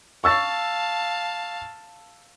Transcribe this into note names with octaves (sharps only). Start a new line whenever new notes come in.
F5 A5 C#6 E6 A6